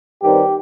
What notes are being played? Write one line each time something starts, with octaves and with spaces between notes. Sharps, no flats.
G2 D#3 G3 C4 G4